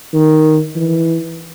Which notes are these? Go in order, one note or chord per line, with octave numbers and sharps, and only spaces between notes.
D#3
E3